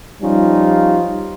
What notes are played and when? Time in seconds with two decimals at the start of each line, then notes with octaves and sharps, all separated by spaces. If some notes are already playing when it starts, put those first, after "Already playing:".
0.22 F3 G3 C#4 D#4 F4